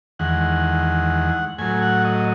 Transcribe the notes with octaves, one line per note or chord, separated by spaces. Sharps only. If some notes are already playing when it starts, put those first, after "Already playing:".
E2 D#3 G#3 F#5
A2 F#3 G#5
F#5
D#5